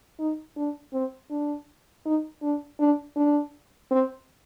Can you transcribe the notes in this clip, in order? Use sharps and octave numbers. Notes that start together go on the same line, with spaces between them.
D#4
D4
C4
D4
D#4
D4
D4
D4
C4